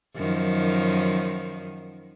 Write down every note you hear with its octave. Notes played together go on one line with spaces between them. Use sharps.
F#2 D#3 F3